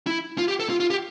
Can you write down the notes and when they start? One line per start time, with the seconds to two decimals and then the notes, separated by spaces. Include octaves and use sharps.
0.07 E4
0.38 F4
0.48 G4
0.60 A4
0.70 F4
0.80 F4
0.90 G4